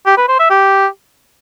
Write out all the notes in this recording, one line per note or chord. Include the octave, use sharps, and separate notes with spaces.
G4
B4
C5
E5
G4